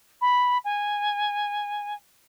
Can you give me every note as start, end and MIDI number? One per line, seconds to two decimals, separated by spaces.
0.21 0.58 83
0.64 1.94 80